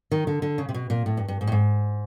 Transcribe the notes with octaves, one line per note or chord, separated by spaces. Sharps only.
D#3
D3
D3
C#3
C3
B2
A#2
A2
G2
G2
G#2
A2
G#2